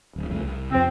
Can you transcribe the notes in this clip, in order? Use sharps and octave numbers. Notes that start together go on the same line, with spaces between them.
D1
C2 F2 A3
C2
F2 C3 C4